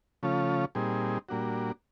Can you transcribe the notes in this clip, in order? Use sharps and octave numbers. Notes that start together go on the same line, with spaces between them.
C#3 F3 A3 C#4 F4
A#2 G3 C4 D#4 G#4
A#2 G3 A#3 D4 F#4